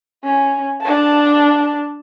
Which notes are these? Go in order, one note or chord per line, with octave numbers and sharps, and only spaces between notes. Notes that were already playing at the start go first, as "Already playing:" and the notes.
C#4
D4 A5